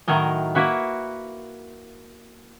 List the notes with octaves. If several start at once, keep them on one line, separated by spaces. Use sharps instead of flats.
A2 D#3 F#3 A#4 D#5
A#3 E4 F#4 B4